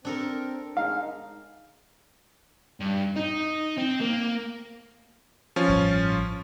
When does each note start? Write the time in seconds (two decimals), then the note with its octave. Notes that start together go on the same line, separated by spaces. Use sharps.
0.05 C4 D4 A4 A#4
0.77 G#3 D#4 F5
2.80 G2
3.16 D#4
3.77 C4
4.01 A#3
5.56 F3 C#4 F4
5.68 A1 G2